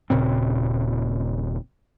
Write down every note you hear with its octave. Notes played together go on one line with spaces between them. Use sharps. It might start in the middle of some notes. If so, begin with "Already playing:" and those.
D#1 A#2 C#3 C4